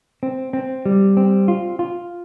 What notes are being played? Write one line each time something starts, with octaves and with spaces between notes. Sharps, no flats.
C4
C4
G3
C4
F4
F4